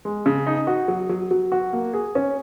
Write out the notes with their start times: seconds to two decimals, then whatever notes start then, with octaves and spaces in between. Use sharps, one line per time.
0.05 G#3
0.26 C#3
0.47 D#4
0.67 F#4
0.88 F#3
1.09 F#3
1.31 F#3
1.52 F#4
1.73 A#3
1.93 G#4
2.15 C#4